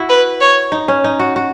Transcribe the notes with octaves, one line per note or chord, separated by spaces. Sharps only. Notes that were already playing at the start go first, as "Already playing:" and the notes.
Already playing: E4 F#4
B4
C#5
D#4
C#4
D#4
F#4
F#4